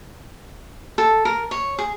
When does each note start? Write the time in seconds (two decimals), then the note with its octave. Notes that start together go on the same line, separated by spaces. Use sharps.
0.98 A4
1.25 A#4
1.51 C#5
1.78 G#4